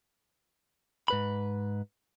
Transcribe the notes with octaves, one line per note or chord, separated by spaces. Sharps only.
G#2 B4 B5